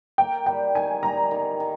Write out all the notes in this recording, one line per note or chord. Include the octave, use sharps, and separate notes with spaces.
A#3 G5
G3 G5
D#3 G#5
G3 A#5
D#3
D#3